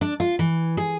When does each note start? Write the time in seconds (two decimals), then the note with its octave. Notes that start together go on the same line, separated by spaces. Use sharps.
0.01 D4
0.20 F4
0.39 E3
0.77 G#4